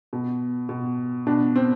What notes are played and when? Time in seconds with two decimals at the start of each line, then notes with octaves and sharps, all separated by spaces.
0.13 B2
0.69 B2
1.27 B2 D4
1.56 C4